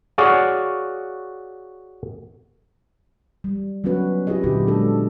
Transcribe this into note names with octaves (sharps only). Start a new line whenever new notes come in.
F#4 G#4 C#5 D5 F5 F#5
G3
F#3 B3 C#4 F#4 B4
E4 F4 G4 G#4 D#5
A#2 D3 F#3 B3 D4 G4
G#3 D4 F#4 A4